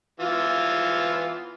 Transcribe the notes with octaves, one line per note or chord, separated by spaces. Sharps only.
E3 B3 F4